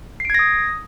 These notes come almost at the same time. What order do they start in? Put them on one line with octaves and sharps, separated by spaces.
C7 D7 G#6 A#6 D#6